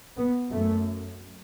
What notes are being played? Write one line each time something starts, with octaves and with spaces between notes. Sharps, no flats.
B3
F#2 A3